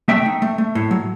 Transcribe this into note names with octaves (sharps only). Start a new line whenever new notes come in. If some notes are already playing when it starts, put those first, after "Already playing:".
A3 E5 G5
D#4
A3
A3
A2
F#3